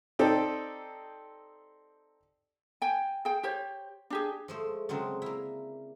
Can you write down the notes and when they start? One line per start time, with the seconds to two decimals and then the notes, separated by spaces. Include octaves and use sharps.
0.19 C4 D#4 G4 A4 D5
2.82 G5 G#5
3.25 G#4 G5
3.43 G4 C5 C#5
4.10 D4 G4 G#4
4.48 F3 G#3 A3
4.89 C#3 F#3 G#3 C4 D4
5.22 A#3 E4